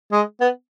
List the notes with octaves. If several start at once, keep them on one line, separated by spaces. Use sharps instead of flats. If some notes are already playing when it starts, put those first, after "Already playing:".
G#3
B3